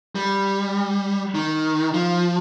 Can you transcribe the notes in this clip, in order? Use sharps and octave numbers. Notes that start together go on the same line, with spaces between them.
G3
D#3
F3